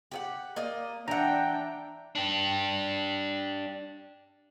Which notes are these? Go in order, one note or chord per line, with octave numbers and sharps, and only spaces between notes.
G4 G#4 F#5
A#3 D5 D#5
E3 D4 E5 F#5 G5 A#5
D4 G4